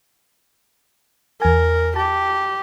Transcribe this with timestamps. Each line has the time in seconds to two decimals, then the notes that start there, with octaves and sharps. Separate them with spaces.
1.42 E2 A#4 G#5
1.96 G4 A5